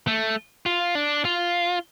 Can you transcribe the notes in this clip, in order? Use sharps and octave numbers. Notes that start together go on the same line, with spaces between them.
A3
F4
D4
F4